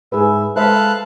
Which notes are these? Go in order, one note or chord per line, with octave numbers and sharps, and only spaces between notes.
G#2 G#4 B4 E5
G#3 A4 B4 C5 E5 F5 F#6